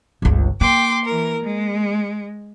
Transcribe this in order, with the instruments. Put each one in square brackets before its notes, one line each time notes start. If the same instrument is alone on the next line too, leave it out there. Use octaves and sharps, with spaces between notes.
[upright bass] G1 C#2
[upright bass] A#3 [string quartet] G5 C6 D6
[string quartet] E3 A#4
G#3